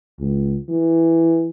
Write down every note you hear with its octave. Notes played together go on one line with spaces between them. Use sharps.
C#2
E3